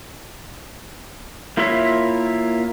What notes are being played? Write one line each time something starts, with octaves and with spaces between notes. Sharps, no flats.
A#3 E4 F4 C#5 E5